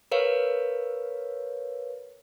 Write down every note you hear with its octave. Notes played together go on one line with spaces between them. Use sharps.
A#4 B4 C#5 F5